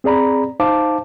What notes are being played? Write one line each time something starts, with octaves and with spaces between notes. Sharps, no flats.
C4 G#4 D5 A#5 B5
D#4 C5 F5 A5 D6